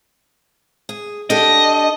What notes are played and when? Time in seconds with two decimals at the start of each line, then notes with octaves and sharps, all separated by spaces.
0.89 G#4
1.30 D4 G4 A4 D#5